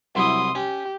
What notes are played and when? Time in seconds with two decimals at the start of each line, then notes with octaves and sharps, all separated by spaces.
0.15 C2 F#3 E4 C6 D#6
0.55 C#4 G4